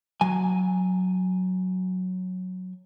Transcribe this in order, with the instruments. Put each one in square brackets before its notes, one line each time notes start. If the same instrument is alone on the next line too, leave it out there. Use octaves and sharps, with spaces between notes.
[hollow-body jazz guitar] F#3 G#5